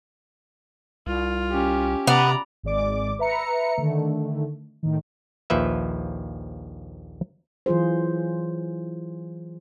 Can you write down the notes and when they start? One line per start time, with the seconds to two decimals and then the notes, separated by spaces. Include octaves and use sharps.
1.07 C2 F4
1.51 C#4 G4
2.07 C3 B3 D5 A#5
2.63 G#1 G#3 D5 D6
3.19 B4 E5 A#5 C#7
3.77 D3 D#3 A3
4.83 A2 D#3
5.50 A#1 D#2 F3 B4 E5
7.66 E3 F#3 F4 G#4 C5